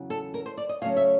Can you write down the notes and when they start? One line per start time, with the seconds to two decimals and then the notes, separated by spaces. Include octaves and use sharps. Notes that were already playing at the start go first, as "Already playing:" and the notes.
Already playing: E2 C#3 F#3
0.10 A4
0.34 A#4
0.46 C5
0.57 D5
0.69 D#5
0.81 C#3 F#3 A3 C#4 F5
0.97 E5